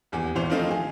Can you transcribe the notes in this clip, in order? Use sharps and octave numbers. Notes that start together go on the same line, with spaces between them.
D#1 E2 G4 G#4
G#1 A#2 E3 C5 F7
D#3 F3 A3 C4 D#4 F4
G#4